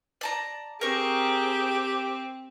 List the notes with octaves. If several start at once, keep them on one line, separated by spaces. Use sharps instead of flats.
D5 A5 A#5
C4 G4 G#4 A#4 C#6